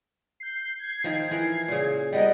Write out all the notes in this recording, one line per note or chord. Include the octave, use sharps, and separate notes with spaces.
G6 C7
G#6 C7
D#3 F3
E3 A#4
A#2 C#3
G3 B3 A#4 D#5